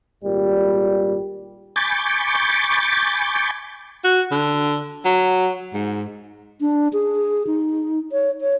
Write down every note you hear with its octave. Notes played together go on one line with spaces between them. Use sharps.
G#1 A#2 G3
G#5 B5 C#6 D6 G6 A6
F#4
D3
F#3
G#2
D4
G#4
D#4
C#5
C#5